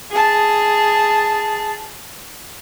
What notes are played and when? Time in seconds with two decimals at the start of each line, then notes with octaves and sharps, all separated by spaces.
0.11 G#4 A5